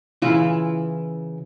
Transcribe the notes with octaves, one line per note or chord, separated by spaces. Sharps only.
C#3 E3 E4 F4